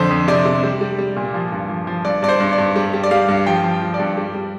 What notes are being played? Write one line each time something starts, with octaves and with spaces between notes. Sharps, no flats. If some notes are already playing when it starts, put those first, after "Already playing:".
Already playing: F2 D3 C5
F2
C3 D5
C3
G3
G3
G3
A#2
F3
G2
F3
F3
G2 D5
G2 D5
C5
G2
D5
G2
G3
G3
D5
G3 F5
G2
F3 G5
F3
F3
D5
G2
G3
G3